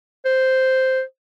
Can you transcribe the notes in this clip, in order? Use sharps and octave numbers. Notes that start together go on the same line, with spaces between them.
C5